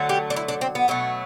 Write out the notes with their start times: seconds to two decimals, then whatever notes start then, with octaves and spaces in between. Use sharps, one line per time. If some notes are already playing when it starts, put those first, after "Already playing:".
Already playing: D3 F#3 A3
0.09 G4
0.30 D4
0.36 E4
0.48 D4
0.61 C4
0.75 B3
0.88 B2 F#3 A3